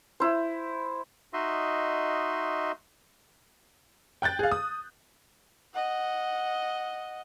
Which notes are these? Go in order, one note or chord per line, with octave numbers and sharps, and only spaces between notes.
E4 C5
D#4 F#4 D#5 E5 C6
G5 F#6 G6 A6
G#4 F5
D#6
D#5 F#5